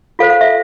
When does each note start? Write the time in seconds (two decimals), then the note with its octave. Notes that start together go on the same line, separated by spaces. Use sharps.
0.19 F4 A4 C5 F5
0.30 F5
0.41 E5